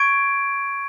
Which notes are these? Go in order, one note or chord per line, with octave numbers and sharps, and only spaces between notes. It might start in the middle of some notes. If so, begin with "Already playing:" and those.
Already playing: C#6 G#6 D7